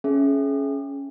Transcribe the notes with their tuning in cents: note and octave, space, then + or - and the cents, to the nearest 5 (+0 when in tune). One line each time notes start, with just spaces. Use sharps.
C#4 +0 G#4 +30 E5 +0